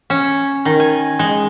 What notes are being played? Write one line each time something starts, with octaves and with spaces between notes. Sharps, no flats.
C#4
D#3
G#5
G#3